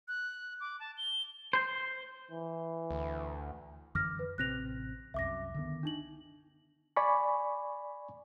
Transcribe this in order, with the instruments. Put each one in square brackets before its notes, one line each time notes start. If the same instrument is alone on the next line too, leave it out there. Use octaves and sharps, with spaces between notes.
[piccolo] F#6
D6
A5
G7
[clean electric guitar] C5
[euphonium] E3
[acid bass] D2
[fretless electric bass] F#2 D3 E3 [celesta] D6 F6 A#6
[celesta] B4
[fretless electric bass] A1 C3 C4 [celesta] F#6 A#6 F7
[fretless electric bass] C2 F#2 [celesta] E5 D6 A#6
[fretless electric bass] D3 D#3 B3
[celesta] D4 D#4 F#7
[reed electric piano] D5 G#5 B5 C#6